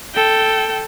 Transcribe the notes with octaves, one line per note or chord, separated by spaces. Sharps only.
A4 G5